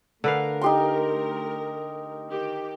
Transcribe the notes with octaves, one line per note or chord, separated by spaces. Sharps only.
D3 A3 A#4 B4 F5
D#4 G4 C6
D#3 G4